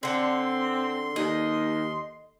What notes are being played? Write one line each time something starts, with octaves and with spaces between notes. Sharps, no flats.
D3 C4 F#5 C6
D#2 D#5